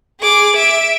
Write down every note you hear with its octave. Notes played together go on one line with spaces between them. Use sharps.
G#4 D6
E5 D7